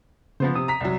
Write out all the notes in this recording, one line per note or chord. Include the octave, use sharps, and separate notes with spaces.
C#3 F3 B3 C5
C3 D#6
A#5 B6
C2 F#3